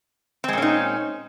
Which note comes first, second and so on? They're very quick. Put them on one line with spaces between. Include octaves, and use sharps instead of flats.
C4 G#3 A#2 C#4 D#4